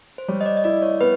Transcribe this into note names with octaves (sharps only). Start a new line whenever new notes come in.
C5
G3 C#5
D#5
D5
D#5
E4 D5
C#5
B3 B4